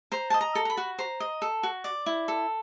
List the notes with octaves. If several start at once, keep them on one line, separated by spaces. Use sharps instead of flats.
C5 A#5
D#5 A5
A#5
A4
A#5
B5
F#4
C5 A#5
D#5
A4
F#4
D5
E4
A4